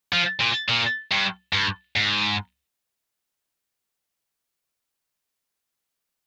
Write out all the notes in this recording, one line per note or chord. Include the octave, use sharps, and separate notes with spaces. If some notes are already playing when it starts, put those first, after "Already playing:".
F3
A#2
A#2
G2
G2
G#2